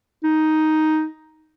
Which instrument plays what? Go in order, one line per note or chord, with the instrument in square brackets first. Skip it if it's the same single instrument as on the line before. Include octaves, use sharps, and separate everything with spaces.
[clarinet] D#4